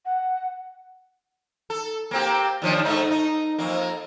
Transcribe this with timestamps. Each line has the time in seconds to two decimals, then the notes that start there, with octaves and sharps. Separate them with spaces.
0.05 F#5
1.70 A4
2.11 A#3 C4 G4
2.62 D#2 F3 D4
2.85 G#2 A3 D#4
3.11 D#4
3.59 F2 A#3